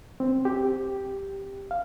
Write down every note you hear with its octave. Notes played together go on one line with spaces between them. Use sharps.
C4
G4
F5